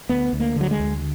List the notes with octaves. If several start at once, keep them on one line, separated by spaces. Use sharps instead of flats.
D2 B3
D2
A#3
D3
F#3
G#3
D2